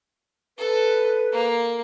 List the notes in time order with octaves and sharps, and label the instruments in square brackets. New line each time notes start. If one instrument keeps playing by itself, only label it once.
[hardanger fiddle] A4 [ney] B4
[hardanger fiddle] A#3